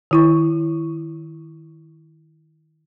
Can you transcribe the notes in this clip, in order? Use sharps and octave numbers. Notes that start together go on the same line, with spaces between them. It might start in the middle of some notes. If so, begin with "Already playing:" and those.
D#3 E4 C#6